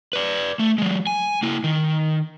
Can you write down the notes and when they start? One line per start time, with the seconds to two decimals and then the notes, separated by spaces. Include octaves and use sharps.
0.13 B4 D5
0.59 A3
0.78 F#3 G#3
1.07 G#5
1.42 A#3 E4
1.64 D#3